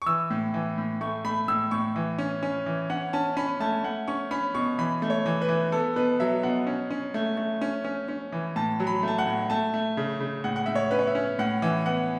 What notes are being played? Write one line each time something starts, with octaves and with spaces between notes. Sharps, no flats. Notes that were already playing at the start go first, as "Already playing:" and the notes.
C#6
E3 E6
A2
E3
A2
A3 C#6
A3 B5
A2 E6
A2 C#6
E3
C#4
C#4
E3
C#4 F#5
C#4 A5
C#4 B5
A3 A5
A3 F#5
C#4 C#6
C#4 B5
B2 C#6
E3 B5
A3
C#5
E3
B4
E3
B3 A4
B2 B4
F#3 E5
B2 F#5
C#4
C#4
A3
A3
C#4
C#4
C#4
E3
A2 A5
F#3
B5
A3 A5
F#5
A2
A3 A5
A3
C#3
C#3
A2 F#5
F#5
A2 E5
C#5
C#4 B4
C#5
E5
C#4
A2 F#5
E3
B3 F#5